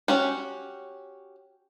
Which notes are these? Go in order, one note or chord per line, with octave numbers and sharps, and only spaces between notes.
C#4 F#4 G4